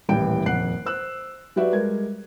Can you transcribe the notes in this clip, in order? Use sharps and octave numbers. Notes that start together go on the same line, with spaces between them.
D#1 A1 E3 G3 G5 D7
D#1 F2 F#5 F#6 C7
C5 E6 F#6
F#3 F#4 G4 B4 D5 E5
G3 G#3 A#4 G#6